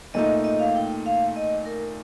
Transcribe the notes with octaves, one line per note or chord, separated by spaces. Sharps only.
A#2 A3 D#4 D#5
D#5
F5
G5
F5
D#5
A#4